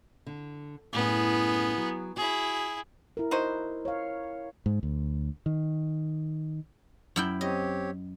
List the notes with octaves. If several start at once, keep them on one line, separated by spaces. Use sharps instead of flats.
D3
F#2 A2 B3 C#4 G#4
F#3
E4 F#4 G#4
E4 A#4
D#4 F#4 C5
C#5 F5
G#2
D2
D#3
F#2 E4 G5
C4 G4 C#5 D#5